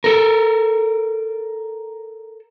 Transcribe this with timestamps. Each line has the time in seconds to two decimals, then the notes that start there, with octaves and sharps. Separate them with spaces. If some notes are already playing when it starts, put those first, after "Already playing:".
0.04 A4 A#4